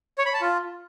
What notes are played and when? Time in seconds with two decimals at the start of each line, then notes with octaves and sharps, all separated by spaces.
0.18 C#5
0.26 B5
0.34 A5
0.41 F4